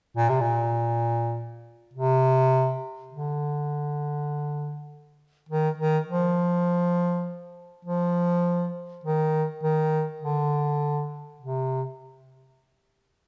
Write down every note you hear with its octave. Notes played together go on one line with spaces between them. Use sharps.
A#2
C3
A#2
C3
D3
D#3
D#3
F3
F3
D#3
D#3
D3
C3